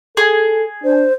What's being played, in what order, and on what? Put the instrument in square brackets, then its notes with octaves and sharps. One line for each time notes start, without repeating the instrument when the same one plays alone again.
[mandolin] G#4 [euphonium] A4
[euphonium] D4 [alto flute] C5